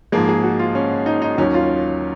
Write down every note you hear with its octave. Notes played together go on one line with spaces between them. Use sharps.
G#2 F3 G#3 A#3
G#4
F#4
F4
C#4
D#4
D#4
D#2 D#3 F#3 C#4
F4